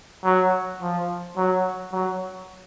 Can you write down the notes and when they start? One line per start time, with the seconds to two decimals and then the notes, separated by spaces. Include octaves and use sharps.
0.25 F#3
0.81 F3
1.37 F#3
1.92 F#3